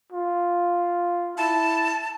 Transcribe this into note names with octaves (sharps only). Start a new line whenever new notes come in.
F4
E4 A5